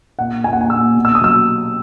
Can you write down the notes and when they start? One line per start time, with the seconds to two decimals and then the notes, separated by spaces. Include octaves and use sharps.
0.19 A#2 F#5
0.44 A#2 G#5
0.53 F#5
0.61 G#5
0.70 A#2 E6
0.96 B2
1.05 E6
1.15 D#6
1.21 F#3 E6